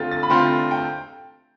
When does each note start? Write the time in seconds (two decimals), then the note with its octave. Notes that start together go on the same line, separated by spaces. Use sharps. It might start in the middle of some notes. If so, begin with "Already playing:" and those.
Already playing: D3 A3 C4 F4 A6
0.11 A6
0.23 B5
0.30 D3 A3 C4 F4 C6
0.71 G5